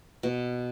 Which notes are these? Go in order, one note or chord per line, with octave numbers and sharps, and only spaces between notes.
B2